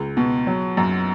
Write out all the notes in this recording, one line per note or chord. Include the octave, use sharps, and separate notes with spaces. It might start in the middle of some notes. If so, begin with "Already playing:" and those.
Already playing: C#2
B2
F#3
F#2